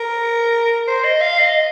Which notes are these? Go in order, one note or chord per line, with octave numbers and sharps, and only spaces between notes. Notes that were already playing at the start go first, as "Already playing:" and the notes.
Already playing: A#4
C5
D#5
F5
D#5